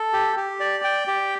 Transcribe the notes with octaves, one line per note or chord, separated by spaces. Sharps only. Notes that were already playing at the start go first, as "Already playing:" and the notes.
Already playing: A4
G4
G4
D5
G5
G4